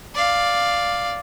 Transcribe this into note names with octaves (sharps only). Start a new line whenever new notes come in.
D5 F5